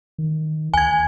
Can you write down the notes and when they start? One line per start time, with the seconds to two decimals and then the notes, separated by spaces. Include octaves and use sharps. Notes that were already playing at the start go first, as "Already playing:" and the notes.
0.18 D#3
0.74 D2 G#5 G#6